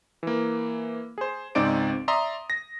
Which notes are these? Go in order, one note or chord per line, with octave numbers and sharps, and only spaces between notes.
E3 A#3
G#4 C5
C#2 G#2 C4 D#4 D5 D7
D5 E5 A#5 C6 D#6
A#6